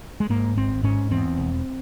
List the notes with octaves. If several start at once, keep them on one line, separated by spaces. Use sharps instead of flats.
G#3
G#2 A#3
G#1 C4
G#2 C#4
E2 C4
E1